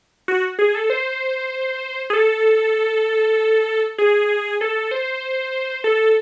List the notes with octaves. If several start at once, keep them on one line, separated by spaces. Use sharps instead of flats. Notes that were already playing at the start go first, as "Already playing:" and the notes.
F#4
G#4
A4
C5
G#4
A4
G#4
A4
C5
A4